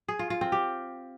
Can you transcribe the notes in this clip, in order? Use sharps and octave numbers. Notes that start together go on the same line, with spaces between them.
G#4
F4
F4
C4
G4